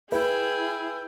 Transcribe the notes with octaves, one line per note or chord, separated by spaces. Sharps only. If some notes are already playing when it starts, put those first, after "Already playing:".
E4 G#4 B4 G5